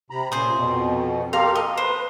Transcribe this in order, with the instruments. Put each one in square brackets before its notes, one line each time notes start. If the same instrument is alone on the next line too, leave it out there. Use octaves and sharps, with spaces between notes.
[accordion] C3 A#5 B5
[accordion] A#2 C#3 [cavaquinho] G#4 C5
[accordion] F2 B2
[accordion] G4 A4 A#4 [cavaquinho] F5 A#5 C6
[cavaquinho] D#5
[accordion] B4 [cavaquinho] C5